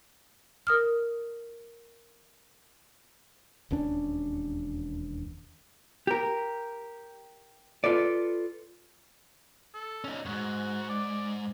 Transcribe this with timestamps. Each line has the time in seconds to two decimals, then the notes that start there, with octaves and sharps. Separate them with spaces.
0.67 A#4 D#6 F6
3.71 E1 D#2 C#4 D4
6.07 G4 A#4
7.84 F4 A4 B4 D5
9.74 A4
10.04 C#4 D#4
10.25 F2 G#2 F#4
10.89 D5